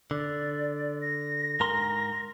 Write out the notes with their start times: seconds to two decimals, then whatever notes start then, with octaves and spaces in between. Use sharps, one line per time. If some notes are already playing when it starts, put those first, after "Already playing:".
0.11 D3 D5
1.02 A#6
1.60 G#2 A#4 C6